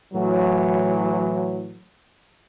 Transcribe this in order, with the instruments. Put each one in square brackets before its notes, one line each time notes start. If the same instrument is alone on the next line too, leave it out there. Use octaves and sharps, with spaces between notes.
[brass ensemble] A2 E3 F#3